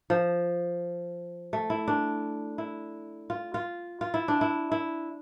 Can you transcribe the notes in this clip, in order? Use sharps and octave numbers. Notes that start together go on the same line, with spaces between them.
F3
A3
E4
D4
E4
F4
F4
F4
E4
D4
E4
E4